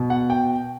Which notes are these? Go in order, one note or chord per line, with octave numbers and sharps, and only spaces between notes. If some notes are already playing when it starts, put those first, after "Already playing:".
Already playing: B2
F#5
G5